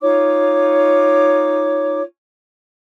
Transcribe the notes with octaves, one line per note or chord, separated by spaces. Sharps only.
D#4 F4 C#5 D6